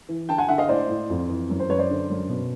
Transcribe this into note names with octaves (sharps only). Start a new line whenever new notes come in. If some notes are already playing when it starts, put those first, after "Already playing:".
E3
D3 G5 A5
F#5 G#5
D3 E5 F#5
D#5 F5
A2 C5 D5
A2
F2
E3
F#2
C5
F#2 B4 C#5
C5 D5
D3
F#2
B2